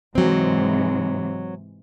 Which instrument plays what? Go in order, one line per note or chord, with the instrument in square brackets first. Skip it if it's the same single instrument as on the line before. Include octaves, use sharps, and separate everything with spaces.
[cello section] G#2 C3 E3 [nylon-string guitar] F#3 C4